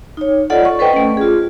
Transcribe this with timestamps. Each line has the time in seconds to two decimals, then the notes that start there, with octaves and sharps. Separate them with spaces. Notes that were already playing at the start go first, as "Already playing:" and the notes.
0.17 D#4 C#5
0.50 F4 A4 D5 D#5 F#5
0.65 C#6
0.79 A4 B4 C5 D#5 G5
0.93 A3 C#4
1.17 F4 G#4